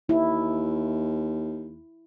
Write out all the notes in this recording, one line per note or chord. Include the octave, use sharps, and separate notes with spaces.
D#2 E4